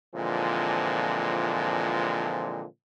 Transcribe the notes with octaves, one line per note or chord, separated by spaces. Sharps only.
A#2 D3 E3 F3 G#3 C4